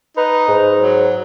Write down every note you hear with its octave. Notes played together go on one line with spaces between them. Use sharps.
D#4 B4
G#2
F#3